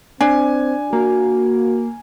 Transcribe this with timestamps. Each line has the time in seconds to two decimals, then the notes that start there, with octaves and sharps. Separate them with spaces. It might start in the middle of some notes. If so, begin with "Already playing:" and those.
0.21 C4 D4 G#5
0.93 A#3 F#4